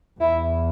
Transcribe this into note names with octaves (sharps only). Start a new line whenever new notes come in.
E2 E4